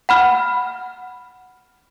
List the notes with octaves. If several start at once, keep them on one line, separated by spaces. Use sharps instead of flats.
F#5 B5 F6